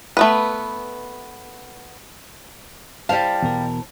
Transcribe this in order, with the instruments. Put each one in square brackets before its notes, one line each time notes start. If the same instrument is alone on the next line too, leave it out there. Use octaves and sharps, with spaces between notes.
[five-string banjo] A3 B3 B4
[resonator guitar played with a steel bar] G3 F5 [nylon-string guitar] E4 C5 A5
[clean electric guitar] E2 B2 A#4